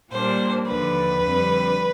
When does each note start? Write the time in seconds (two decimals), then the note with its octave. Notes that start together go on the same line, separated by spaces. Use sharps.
0.12 A#2 G3 A#3 D4 C5
0.68 D#2 D3 F3 B4
1.23 F2 D3 G3 C4